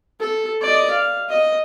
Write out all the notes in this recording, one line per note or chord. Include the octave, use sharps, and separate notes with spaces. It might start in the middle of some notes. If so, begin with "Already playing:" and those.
A4
D5 D#5
F5
D#5